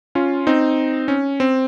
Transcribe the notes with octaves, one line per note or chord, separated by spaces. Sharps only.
C#4 F4
C4 D#4
C#4
C4